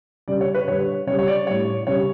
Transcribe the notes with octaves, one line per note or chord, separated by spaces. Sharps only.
C#3 G3 D5
C#5
B4
D3 G3 C#5
C#3 G3 C#5
C#5
D5
A2 G3 C#5
C#3 G3 C#5